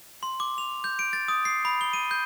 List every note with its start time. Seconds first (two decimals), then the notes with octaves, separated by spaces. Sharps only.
0.23 C6
0.40 D6
0.58 F7
0.84 G6
0.99 D7
1.13 A6
1.28 D#6
1.45 C7
1.65 B5
1.81 G7
1.93 D#7
2.11 G6